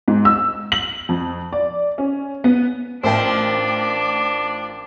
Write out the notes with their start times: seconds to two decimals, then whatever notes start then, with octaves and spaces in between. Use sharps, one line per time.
0.08 G#2
0.25 E6
0.72 F#7
1.09 F2
1.53 D5
1.98 C#4
2.44 B3
3.03 A1 F3 D4 A#4 C5 G5 D6